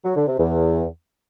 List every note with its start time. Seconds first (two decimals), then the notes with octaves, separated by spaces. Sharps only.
0.04 F#3
0.16 D3
0.27 C3
0.39 E2